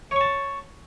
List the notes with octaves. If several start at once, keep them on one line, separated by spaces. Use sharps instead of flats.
C#5 A5 C#6